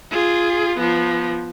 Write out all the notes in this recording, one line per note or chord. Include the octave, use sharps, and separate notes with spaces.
F4 G#4
F3 B3